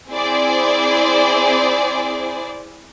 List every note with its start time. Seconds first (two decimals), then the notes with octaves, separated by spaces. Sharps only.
0.10 C4 E4 G#4 C5 D5